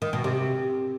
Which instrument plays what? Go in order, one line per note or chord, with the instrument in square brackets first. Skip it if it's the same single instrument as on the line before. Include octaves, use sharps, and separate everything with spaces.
[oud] D#3
B2
C3